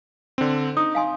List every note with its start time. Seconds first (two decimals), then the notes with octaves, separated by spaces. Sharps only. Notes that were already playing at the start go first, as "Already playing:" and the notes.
0.38 D3 C4
0.77 D#4 D#6
0.95 F5 G#5 C6